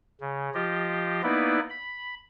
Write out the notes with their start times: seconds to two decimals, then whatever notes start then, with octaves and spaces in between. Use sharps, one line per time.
0.21 C#3
0.54 F3 F4 G4 D#5
1.23 A#3 B3 D#4 E4 B4 D5
1.70 B5